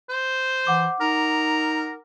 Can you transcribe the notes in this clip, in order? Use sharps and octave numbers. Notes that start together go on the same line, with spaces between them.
C5
E3 F#5 D6
D#4 A#4